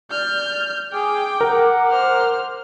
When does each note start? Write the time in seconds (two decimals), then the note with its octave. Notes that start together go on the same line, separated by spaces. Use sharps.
0.11 D5 F6 G6
0.93 G#4 G5 D6
1.41 A#4 F#5
1.90 C5 F6